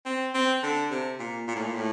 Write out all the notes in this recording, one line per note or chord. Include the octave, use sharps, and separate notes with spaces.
C4
C4
D3
C3
A#2
A#2
A2
A#2
A2